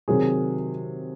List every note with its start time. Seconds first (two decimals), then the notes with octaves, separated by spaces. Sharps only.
0.08 C3 D#3 F#3 G#4